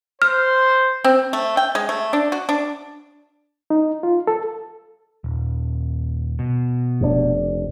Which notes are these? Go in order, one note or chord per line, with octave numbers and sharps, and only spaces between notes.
C5 F6
C4
A3
G5
G#3
A3
D4
F#4
D4
D#4
F4
A4
D#1
B2
F1 G#2 D4